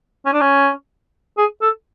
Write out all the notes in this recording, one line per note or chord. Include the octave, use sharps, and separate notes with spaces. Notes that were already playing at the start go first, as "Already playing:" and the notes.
C#4
D4
C#4
G#4
A4